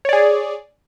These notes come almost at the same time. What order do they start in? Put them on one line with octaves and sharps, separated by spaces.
C#5 D5 G#4